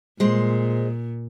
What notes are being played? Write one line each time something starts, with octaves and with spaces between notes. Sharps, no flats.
A#2 G#3 C5